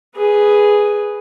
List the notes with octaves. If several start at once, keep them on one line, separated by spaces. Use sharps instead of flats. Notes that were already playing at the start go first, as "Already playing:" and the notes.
G#4 B4